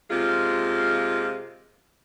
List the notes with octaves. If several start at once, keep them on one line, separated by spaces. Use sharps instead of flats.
C3 G#3 A#3 F4